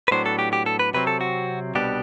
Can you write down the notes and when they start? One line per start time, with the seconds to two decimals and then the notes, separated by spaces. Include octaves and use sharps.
0.08 B4
0.11 A2 F#3 B3 D4 C5
0.26 A4
0.39 G4
0.53 G4
0.66 A4
0.79 B4
0.94 C3 F#3 C4 B4
1.07 A4
1.21 F#4
1.75 C2 B2 G3 B3 D4 G4